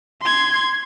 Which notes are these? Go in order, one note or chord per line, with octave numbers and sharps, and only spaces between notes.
C6 G#6